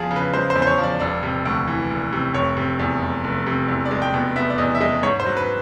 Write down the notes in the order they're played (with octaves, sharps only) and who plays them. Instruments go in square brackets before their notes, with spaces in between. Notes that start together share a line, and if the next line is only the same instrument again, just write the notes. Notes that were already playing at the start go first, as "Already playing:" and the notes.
Already playing: [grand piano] E2 F3 G#4
C#3
B4
G#3 C5
C5
E2
C5
C#5
F3
D5
E1 D5
C3
D2
E3
E1
C3
F1 C#5
C3
E2
F1
F1
C3
E2
D5
G#3
G5
B2
B3 E5
D5
E2 D#5
E5
G#3 D#5
G#2 C#5
C5
F#3
B4